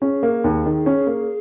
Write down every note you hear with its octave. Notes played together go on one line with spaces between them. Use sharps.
C#4 G#4
A#3
D#2
D#3
C#4
A#3